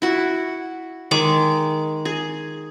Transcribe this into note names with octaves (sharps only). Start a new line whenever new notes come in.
E4 F#4
D#3 G#3 D6
G#4